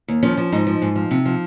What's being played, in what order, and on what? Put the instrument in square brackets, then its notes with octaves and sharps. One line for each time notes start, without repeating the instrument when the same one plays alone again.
[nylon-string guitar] D#2
F3 C#4
F3
G#2 D#4
F3
G#2
F3
C3
F3